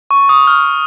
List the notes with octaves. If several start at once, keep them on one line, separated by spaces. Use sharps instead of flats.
C#6
D#6
F6